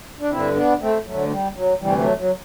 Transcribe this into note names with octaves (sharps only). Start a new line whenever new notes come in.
D4
G2 D3 C4 E4
B3 D4
A3 C4
D2 D3 F#3 A3
G3
F#3
D2 C3 E3 G3
F#3 A3
F#3